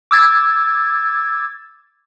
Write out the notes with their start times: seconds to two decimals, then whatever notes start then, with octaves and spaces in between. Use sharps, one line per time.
0.11 D6 E6 G#6 A6